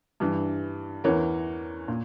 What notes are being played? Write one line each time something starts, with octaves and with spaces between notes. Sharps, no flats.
G2 E3
E2 E3 A#4 C#5
A#2